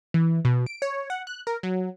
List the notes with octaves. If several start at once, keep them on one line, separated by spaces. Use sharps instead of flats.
E3
B2
D7
C#5
F#5
F#6
A#4
F#3